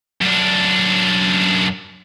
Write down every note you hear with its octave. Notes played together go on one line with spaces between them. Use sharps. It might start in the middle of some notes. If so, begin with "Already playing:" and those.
F#2 D4